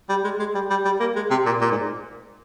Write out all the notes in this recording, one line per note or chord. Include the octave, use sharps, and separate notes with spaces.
G3
G#3
G#3
G3
G3
G3
A#3
G#3
C3
A#2
A#2
G#2